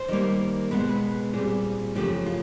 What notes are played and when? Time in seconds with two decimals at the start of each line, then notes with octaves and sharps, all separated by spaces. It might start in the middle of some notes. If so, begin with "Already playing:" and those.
Already playing: C5
0.08 D#3 G3 A#3
0.71 B2 G#3 B3 B4
0.80 C5
0.89 B4
1.33 A#2 G3 C4 G#4
1.95 F#2 C#3 F3 A3 G4
2.26 F4